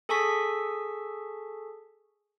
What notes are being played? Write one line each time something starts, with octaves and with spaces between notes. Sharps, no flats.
G#4 A4 G#5 A5 C#6 B6